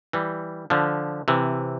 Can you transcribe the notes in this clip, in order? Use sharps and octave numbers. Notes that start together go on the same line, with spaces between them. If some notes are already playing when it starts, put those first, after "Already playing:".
E3 G3
D3 F3
C3 E3